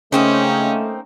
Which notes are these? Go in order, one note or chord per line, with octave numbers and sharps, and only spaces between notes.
C#3 A3 A#3 C4 C#4 D#4